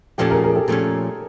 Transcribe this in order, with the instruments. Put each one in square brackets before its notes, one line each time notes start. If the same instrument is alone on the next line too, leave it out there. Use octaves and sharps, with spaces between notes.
[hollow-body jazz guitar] A#2 F3 A3 C#4 [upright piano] G4 A4
[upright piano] G#4 A#4
G#4 A#4
G4 A4
[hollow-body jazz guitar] A#2 F3 A3 C#4